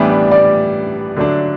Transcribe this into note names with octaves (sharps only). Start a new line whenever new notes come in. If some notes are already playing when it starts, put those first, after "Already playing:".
Already playing: A2 E3 G3 B3 D4
D5
D5
D3 F#3 A3 D4